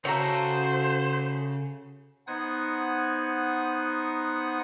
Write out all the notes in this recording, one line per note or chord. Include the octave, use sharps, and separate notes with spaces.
C#3 A3 F#4 A4 C5 C#5 A#5
B3 D#4 C5 F#5 D#6 G#6